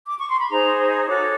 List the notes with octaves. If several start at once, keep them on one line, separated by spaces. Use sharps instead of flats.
D6
C#6
C6
B5
D#4 G#4 C5 A#5
D#6
F#4 A4 C#5 D6